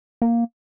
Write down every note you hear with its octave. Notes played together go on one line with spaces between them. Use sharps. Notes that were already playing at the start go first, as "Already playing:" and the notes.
A#3